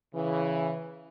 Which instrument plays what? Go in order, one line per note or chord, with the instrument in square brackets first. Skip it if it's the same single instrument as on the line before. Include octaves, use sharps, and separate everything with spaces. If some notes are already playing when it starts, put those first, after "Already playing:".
[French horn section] C#3 E3